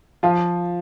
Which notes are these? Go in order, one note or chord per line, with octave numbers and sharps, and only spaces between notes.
F3 F4